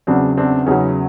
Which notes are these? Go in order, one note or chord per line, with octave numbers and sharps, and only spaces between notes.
E2 C#3 F#3 C4 D4
C4 D4
E2 C#3 F#3 C#4 D#4